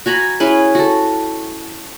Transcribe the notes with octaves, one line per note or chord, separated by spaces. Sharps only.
F#4 G#5 A#5 B5
C#4 E4 G#4 B4
F#4 A4